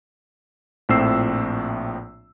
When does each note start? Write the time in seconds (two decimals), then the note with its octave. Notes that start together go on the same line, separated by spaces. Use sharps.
0.89 A#1 A2 F3 C4 E6 C7